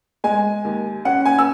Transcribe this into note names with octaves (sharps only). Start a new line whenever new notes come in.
G#3 G#5
D#2
C#4 F#5
G#5
E6